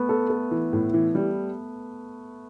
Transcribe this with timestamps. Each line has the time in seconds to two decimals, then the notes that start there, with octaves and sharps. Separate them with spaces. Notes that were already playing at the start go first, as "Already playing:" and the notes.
Already playing: A3 B3
0.09 A4
0.30 A4
0.51 E3
0.73 A2
0.94 E3
1.15 G3